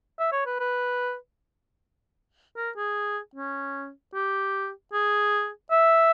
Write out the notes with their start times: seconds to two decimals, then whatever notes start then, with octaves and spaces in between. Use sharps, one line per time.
0.20 E5
0.32 C#5
0.46 B4
0.60 B4
2.57 A#4
2.77 G#4
3.35 C#4
4.14 G4
4.93 G#4
5.71 E5